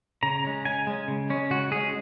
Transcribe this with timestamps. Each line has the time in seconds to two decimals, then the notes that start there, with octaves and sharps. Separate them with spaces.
0.23 C#3 A#5
0.44 G#3 C#4
0.65 C#3 G#5
0.87 G#3 C#4
1.08 C#3
1.30 G#3 C#4
1.50 C#3 F#4
1.71 G#3 C#4 G#4